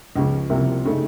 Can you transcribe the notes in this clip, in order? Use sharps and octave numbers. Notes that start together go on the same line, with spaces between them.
C#2 C#3 F3
C2 C3 F3 A#3
C#3 A3 D#4